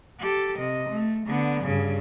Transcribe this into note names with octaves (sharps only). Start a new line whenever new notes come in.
G4 A4
C3 D#5
A3
D3 B3
G2 C#3